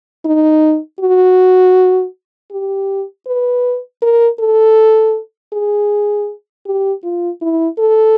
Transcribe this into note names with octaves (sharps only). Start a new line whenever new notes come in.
D#4
F#4
G4
B4
A#4
A4
G#4
G4
F4
E4
A4